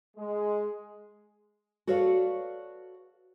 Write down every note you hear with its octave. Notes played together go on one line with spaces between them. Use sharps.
G#3
F#4 A4 B4 C#5 D5 F5